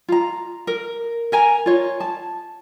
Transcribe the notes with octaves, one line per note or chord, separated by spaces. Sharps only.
F4 A#5
A#4
A#4 G#5 A#5
F4 C#5
A5